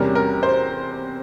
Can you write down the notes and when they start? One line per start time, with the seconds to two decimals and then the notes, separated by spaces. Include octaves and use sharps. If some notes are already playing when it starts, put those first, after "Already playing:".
Already playing: E2 C3 G3 C#4 A#4
0.15 A#4
0.43 C5